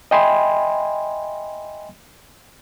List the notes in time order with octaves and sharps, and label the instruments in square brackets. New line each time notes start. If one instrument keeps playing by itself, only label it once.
[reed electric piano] D#5 E5 G5 G#5 B5 C6